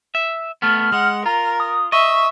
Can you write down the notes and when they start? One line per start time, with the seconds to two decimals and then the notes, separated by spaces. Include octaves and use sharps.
0.15 E5
0.62 A3 B3 F6
0.92 G#3 F#5
1.26 F4 A#4 A#5
1.60 D#6
1.92 D#5 E5 C#6